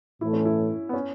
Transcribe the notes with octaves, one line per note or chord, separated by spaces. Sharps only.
A2 E3 A3 E4
C#4
E4
B3
C#4